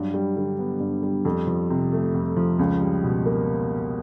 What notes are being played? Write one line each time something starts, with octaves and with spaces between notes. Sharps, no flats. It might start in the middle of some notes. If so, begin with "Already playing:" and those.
Already playing: G2 F#3
G3
D3
B3
G2
G3
F2
F3
C3
A3
F2
F3
C#2
G3
B2
A#3